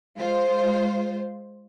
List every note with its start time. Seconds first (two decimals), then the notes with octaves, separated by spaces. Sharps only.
0.17 G#3 F4 C5